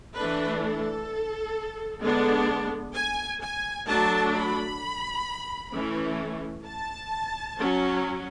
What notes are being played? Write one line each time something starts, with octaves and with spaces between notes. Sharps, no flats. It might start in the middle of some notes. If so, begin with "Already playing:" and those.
E3 A3 D4 B4
A4
D3 G#3 B3 D4
G#5
G#5
F#3 A3 D4 A5
B5
E3 A3 C#4
A5
F#3 C#4